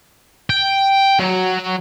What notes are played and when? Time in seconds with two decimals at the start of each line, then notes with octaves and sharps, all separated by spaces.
0.50 G5
1.19 F#3